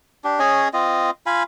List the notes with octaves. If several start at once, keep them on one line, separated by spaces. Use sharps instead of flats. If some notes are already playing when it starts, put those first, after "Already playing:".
D4 G4
C#4 G#4 C#5 D#5
C4 F4 D#5
F4 F5 G#5 B5